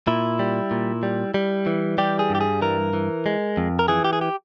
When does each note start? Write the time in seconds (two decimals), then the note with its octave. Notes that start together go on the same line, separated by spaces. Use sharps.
0.07 A#2 E4
0.39 G3
0.71 A#2
1.03 G3
1.34 G3
1.67 E3
1.98 G3 G4
2.19 G#4
2.30 G2 G4
2.41 G#4
2.61 E3 A#4
2.93 E3
3.26 G#3
3.57 F2
3.79 A#4
3.88 E3 G#4
4.04 G4
4.13 G#4
4.21 G4